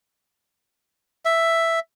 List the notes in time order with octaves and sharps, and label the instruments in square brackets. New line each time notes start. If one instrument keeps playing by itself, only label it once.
[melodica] E5